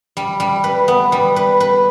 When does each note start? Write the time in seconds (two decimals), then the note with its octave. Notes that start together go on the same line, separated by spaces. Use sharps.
0.17 G3
0.40 G3
0.64 B4
0.88 B3
1.12 G3
1.36 B4
1.60 B4